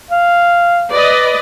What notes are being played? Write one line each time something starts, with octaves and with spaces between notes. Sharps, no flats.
F5
B4 D5 D#5